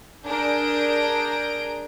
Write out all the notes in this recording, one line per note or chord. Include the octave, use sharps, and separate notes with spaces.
D4 G#4 A#4 A#5 G6 D7